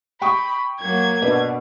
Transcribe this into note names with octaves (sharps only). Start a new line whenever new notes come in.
G5 B5 C#6 D#6
F#3 A#3 G#6
B2 D4 B4 D5